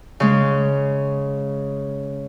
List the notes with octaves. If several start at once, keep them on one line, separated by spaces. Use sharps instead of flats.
C#3 G#3